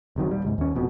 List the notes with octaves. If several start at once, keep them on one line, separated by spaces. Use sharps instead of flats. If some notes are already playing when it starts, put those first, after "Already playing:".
F#1 C3 D#3 F#3
D#1 G3
C#2 G#2
D#2 C#4
F1 F2 B2